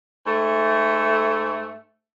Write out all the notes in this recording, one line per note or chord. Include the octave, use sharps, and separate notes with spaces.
G#2 A3